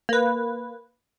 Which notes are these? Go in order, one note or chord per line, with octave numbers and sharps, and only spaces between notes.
A#3 B4